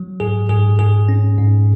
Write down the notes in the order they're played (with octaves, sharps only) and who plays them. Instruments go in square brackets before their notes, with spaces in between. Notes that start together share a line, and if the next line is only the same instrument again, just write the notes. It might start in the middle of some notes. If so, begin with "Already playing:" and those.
Already playing: [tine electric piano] F#3
G#2 G#4
G#2 G#4
G#2 G#4
C#4
G#2